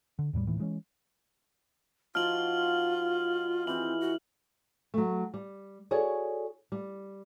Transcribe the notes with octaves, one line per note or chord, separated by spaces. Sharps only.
D3
E2 A2 F#3 G3
E1 D#2 A2 E3
E3 G#3 A3 C#4
F3 D#4 F4 F#4 F6 F#7
E3 C4 G#4 F#7
F#4
F#3 A3
G3
F#4 G#4 A4 C#5 D5
G3